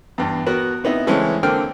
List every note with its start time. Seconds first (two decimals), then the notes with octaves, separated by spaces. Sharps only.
0.18 E2 G2
0.47 B3 F#4 A#4
0.84 C3 B3 D#4 E4
1.07 C#3 E3 G#3 A3 C4 C#4
1.43 D3 A#3 C4 G5 F6